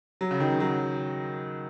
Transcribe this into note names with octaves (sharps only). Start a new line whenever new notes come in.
F#3
C#3
D#3
F#3